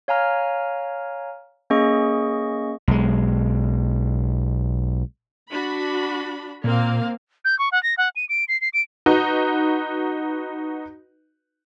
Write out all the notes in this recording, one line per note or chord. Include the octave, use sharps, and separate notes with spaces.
C#5 F5 G#5 A#5 F6
A#3 C#4 G#4 D#5 C#6
B1 G#3
D4 F#4 B5
A#2 A#3 C4 F5
G6
C#6
F#5
A#6
F#5
D#7
D7
C7
C7
D7
D#4 F#4 B4